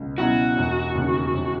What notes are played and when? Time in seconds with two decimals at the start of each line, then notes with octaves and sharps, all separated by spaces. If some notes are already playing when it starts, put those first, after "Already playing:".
Already playing: C#2 B2 F#3 C#4
0.18 B2 F#3 C#4 E4 F#4
0.57 E1
0.95 D#2 C#3
1.34 E1